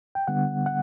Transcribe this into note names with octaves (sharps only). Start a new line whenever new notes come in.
G5
D3 G3 B3 F#5
F#5